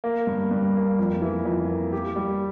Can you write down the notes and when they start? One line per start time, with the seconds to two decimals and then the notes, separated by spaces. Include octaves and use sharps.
0.04 A#3
0.27 G2
0.51 G2
0.75 A#3
0.99 F2
1.22 E3
1.45 F2
1.69 A#3
1.93 G4
2.16 G3